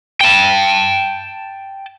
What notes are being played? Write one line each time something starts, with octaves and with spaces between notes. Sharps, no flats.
G5 A5